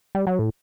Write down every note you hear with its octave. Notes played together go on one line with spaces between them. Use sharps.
G3
F#3
A2